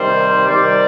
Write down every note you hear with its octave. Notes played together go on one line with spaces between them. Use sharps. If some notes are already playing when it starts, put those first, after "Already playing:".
Already playing: C3 D#3 G3 C5
C3 D#3 G3 D5